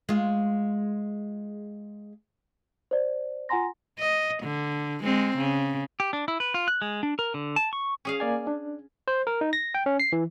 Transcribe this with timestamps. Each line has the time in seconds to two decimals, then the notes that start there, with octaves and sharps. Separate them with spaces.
0.09 G#3 F4
2.91 C5 D5
3.49 F4 F#5 G#5 A#5 C6 A#6
3.99 D#5
4.42 D3
5.03 G#3 C4
5.37 C#3
6.00 G4
6.13 D4
6.28 E4
6.40 B4
6.54 F4
6.68 F#6
6.82 G#3
7.03 D4
7.19 A#4
7.34 D3
7.56 A5
7.73 C#6
8.05 C#4 G#4 F5
8.20 A#3 D5 G#5
8.47 D4
9.08 C5
9.27 A#4
9.41 D#4
9.53 A#6
9.74 G5
9.86 C#4
10.00 C7
10.12 E3